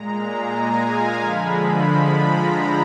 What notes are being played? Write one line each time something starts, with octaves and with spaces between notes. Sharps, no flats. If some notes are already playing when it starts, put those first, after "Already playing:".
Already playing: A#2 G#3 A#5
A#5
G#5
F5
D3 F3 G#3 B5
B5
A#5